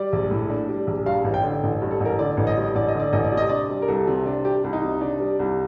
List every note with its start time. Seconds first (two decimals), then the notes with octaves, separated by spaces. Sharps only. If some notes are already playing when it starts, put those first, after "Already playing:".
Already playing: G3 D5
0.13 A#1
0.31 A2
0.50 D4
0.68 G3
0.87 A#1
1.06 G2 F5
1.24 A1
1.34 G5
1.43 D3
1.63 A1
1.82 G2
1.91 A4
2.00 A1 A#4
2.19 D3 D5
2.37 A1
2.47 D#5
2.57 G2
2.75 A1 D5
2.88 D#5
2.95 D3 D5
3.13 A1 D#5
3.24 D5
3.32 C3
3.37 D#5
3.50 D4 D5
3.69 G3
3.82 A#4
3.88 C2 A4
4.07 C3
4.26 D4
4.45 G3 G4
4.64 C2
4.73 D#4
4.83 C3
5.01 D4
5.20 G3
5.39 C2